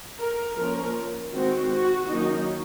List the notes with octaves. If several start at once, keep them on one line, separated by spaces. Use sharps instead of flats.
A#4
F3 A#3 C#4 A#4
D#3 G#3 C4 F#4
F#4
D#3 F#3 A#3 C#4 D#4